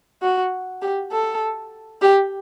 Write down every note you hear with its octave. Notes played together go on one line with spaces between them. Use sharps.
F#4
G4
A4
G4